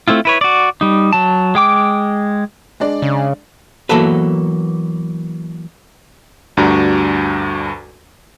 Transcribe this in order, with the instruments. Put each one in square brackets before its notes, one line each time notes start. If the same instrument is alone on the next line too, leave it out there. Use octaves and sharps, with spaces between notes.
[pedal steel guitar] A3 C4 E4 F4
E4 B4 C#5
F#4 D5
G3 D#4
F#3 A5
G#3 G5 D6
[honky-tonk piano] G#3 D4 D5
[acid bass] C#3
[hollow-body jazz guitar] E3 F#3 A#3 B3 A4 B4
[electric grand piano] D2 G2 D4 F#4 A#5